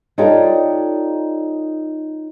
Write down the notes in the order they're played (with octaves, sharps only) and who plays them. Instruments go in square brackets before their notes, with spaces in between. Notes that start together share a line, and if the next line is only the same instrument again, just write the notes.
[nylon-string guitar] D#4 F4 G4 A4 C#5 D5